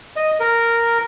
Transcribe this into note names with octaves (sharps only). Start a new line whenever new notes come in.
D#5
A#4